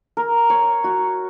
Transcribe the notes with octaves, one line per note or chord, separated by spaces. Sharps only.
A#4
C#5
F#4